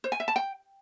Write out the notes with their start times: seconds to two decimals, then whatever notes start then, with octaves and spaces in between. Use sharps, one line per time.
0.04 C5
0.12 G#5
0.20 E5
0.28 A5
0.36 G5